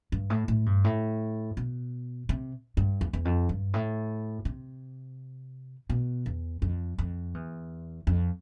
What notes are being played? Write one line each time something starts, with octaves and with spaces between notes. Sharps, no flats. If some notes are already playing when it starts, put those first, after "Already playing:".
G2
A2
A2
G2
A2
B2
C3
G2
E2
E2
F2
G2
A2
C3
B2
E2
F2
F2
E2
F2